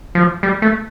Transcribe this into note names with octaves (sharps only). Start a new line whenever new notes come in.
F3
G3
A3